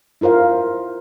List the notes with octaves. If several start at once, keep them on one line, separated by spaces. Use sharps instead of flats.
E4 F4 A#4 C5 F5